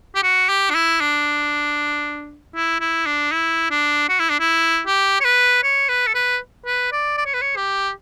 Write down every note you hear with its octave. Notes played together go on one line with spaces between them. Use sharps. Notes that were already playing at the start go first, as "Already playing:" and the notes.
G4
F#4
G4
D4
E4
D4
E4
E4
D4
E4
D4
F#4
E4
D4
E4
G4
C#5
B4
C#5
B4
A4
B4
B4
D5
D5
C#5
B4
C#5
G4